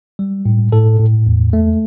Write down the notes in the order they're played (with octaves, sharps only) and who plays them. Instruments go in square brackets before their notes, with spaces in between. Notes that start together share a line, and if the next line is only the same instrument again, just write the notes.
[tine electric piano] G3
A2
A2 A4
A2
E2
A3